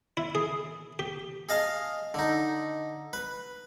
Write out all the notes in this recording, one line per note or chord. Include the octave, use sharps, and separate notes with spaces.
E4
G#4
G4
G#4 D#5 F5 A5
D3 D#4
B4